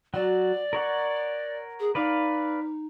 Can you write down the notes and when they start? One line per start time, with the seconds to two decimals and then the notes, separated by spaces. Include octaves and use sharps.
0.14 F#3 F#4 D5
0.73 A#4 C#5 F#5
1.79 G#4
1.95 D#4 B4 D5 F5